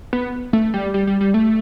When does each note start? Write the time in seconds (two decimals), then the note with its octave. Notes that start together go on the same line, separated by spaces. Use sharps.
0.13 B3
0.53 A3
0.74 G3
0.94 G3
1.07 G3
1.21 G3
1.34 A3